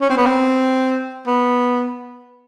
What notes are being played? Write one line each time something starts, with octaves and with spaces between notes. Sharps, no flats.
C#4
C4
B3
C4
B3